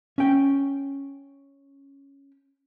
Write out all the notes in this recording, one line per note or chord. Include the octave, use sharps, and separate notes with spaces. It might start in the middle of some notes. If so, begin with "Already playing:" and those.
C#4 G5